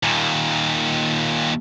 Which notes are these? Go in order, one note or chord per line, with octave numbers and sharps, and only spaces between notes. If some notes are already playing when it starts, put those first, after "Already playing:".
D#2 A#2